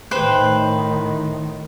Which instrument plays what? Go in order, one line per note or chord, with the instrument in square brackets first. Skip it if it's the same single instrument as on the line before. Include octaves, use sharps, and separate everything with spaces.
[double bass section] A2 D#3 [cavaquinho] B4 C5 G5